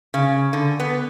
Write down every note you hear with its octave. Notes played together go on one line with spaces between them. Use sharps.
C#3
D3
B3